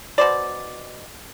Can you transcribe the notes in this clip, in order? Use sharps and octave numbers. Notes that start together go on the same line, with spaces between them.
B2 C5 D5